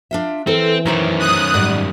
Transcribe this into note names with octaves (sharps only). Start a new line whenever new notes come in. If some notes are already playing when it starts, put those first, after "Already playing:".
D4 F4 E5
E3 C4 A4 A#4
F#2 D#3 C5 C#5 A#5
D#6 F#6
G#2 G3 D5